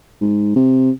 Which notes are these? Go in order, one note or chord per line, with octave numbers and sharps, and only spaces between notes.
G#2
C3